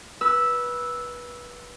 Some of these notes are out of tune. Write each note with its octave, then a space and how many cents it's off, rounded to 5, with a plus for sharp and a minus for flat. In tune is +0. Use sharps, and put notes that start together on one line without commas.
B4 -20 E6 -5